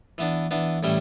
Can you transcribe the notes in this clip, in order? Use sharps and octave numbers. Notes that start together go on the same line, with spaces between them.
E3 B3 D4
E3 B3 D4
A2 E3 G3 C#4 E4